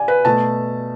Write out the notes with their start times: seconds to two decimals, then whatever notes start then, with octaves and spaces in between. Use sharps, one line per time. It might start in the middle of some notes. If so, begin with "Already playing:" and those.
Already playing: D5 G#5
0.08 B4
0.25 B2 A3 A5